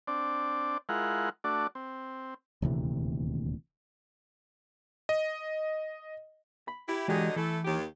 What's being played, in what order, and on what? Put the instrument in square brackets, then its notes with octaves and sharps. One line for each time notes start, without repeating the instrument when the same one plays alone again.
[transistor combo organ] C4 D4 D5
G#3 E4 F4 A#4 F#5
A3 D4 F#4 D5
C4
[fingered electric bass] D#1 D2 C3 E3
[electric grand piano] D#5
[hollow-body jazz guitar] B5
[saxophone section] E4 G4
[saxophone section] D3 F#3 D#5 [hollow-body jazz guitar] E3 G#3 G4
[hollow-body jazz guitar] E3 [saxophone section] A3 E4 A4
[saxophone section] D#2 G4